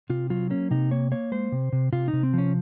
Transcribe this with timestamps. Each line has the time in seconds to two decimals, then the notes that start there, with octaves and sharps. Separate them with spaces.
0.10 C3 F4
0.30 F#3 F4
0.50 A#3 C#4
0.71 C3 D#4
0.91 A#3 C#5
1.11 A#3 C#5
1.32 G#3 C5
1.52 C3
1.73 C3
1.92 C3 F4
2.08 D#4
2.13 C3
2.23 C4
2.33 F3 C#4